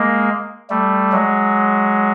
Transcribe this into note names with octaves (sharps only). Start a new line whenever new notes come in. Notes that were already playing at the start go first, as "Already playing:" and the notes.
Already playing: G#3 A#3
G3 A3
F#3 G#3